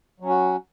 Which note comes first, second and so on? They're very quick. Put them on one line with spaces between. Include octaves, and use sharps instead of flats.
F#3 C#4 F#4